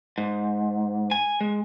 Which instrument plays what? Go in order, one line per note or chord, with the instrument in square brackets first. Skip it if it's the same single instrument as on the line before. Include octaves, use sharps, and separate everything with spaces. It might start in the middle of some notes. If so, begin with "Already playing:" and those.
[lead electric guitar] G#2
G#5
G#3